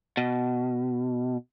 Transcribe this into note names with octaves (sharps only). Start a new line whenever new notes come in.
B2